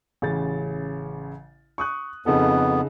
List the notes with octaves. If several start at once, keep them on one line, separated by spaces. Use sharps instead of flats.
A1 C#3 A6
C#6 D#6 F#6
F2 C#3 B3 D#4 A4